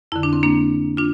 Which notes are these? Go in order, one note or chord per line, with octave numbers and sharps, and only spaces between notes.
F2 D3 E4
D4
C4
A#3 D4
D4 F4